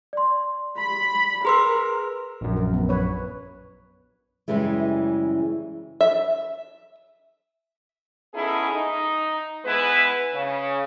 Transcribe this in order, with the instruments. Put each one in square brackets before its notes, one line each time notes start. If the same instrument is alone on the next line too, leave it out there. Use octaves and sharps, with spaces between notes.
[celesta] D5 C6
[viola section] B5
[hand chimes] G#4 B4 E6 [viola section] A#4 [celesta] A#5 C6
[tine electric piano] A#1 F#2
[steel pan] A#4
B3
B4 C#5
[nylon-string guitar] F#2 A2 C#3 E3 G3 G#3
[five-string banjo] E5
[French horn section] B3 C#4 D#4 E4 G#4 A4
D#4
G#3 B3 E4 B4
C#3